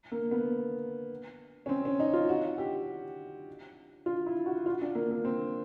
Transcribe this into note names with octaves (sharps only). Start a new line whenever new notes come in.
A#3
B3
C#4
C4
C#4
D#4
F4
F#4
G4
F4
E4
F#4
F4
D4
A#3
A#3
C4